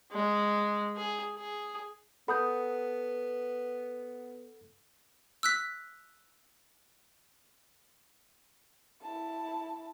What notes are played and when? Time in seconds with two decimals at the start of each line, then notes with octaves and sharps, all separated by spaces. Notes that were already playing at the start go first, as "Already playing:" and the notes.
0.12 G#3
0.96 G#4
1.36 G#4
2.28 B3 A4 F#5 B5 D#6 G6
5.43 E6 F#6 B6
9.02 E4 A5